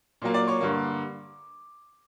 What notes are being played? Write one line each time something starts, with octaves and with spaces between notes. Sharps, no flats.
A#2 F#3 A#3
D5 D6
C#5 C#6
G2 D3 A#3